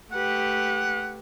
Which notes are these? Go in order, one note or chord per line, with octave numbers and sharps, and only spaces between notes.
A3 G4 B4 F#5